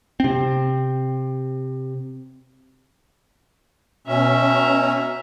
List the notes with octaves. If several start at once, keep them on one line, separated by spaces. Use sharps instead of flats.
C3 C4
B2 C#4 E5 A#5